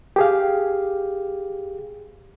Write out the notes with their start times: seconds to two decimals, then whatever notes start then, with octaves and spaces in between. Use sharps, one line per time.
0.16 G4 G#4 F5